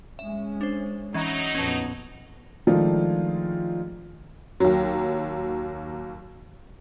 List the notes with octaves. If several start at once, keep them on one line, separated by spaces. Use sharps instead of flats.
G#3 C#4 E5
D4 C5
E3 F#3 C#4 D#4
A#1 F2 B3 C#4 A5
D#3 F3 G#3 A3 D4 F4
D#2 F#3